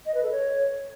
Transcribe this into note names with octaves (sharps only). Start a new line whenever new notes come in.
D#5
B4
A4
C#5